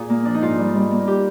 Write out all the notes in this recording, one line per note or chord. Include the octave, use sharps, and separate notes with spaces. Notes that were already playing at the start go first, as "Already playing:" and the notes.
Already playing: A#2 F4 G#4
A#3
F3 D4
D#4
G#2 F4
G3
G3
A#3
G4